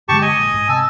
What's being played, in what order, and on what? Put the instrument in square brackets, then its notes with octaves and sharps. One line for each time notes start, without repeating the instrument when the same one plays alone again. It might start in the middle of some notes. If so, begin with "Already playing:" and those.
[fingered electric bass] G2 D3 G#3 [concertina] G4 A5 C#6
[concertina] D#5 G#5
[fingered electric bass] A#1
G#2
[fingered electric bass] C3 [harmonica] G#5 A5 E6